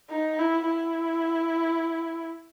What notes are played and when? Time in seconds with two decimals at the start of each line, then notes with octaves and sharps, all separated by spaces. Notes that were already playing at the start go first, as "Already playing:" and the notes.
0.10 D#4
0.39 E4
0.68 E4